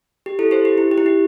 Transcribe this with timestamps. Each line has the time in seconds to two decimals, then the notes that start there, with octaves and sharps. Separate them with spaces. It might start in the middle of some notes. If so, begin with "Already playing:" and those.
0.26 G4
0.39 E4 A4
0.51 G4 C5
0.65 G4
0.78 E4
0.91 G4
0.98 E4
1.06 G4